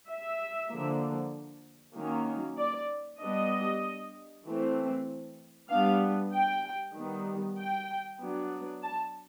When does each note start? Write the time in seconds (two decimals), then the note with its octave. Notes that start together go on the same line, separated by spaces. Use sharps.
0.09 E5
0.70 D3 F3 A#3
1.95 D#3 F#3 A#3 C#4
2.58 D5
3.20 G3 B3 D4 D#5
4.46 E3 A3 C4
5.70 G3 B3 D4 F5
6.33 G5
6.95 D#3 G3 B3
7.58 G5
8.20 F#3 B3 D4
8.83 A5